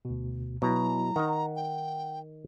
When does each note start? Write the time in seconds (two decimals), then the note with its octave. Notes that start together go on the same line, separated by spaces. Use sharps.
0.05 D2 B2
0.62 B2 F#3 E4 A#5
1.16 D#3 D#4 F#5
1.56 G5